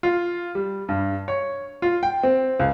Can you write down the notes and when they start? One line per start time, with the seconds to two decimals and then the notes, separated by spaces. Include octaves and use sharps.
0.03 F4
0.55 G3
0.89 G2
1.28 C#5
1.82 F4
2.03 G5
2.23 C4
2.59 C#2